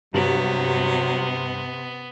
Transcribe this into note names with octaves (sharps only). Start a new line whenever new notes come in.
G2 C3 F#3 B3